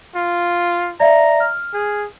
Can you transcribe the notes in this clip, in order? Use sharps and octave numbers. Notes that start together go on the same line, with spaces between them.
F4
D5 E5 F5 A#5
F6
G#4